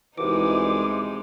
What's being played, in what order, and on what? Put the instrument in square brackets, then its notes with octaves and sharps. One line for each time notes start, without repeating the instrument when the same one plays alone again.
[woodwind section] C2 B2 E3 [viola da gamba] G#3 C4 D#4 [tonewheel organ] D6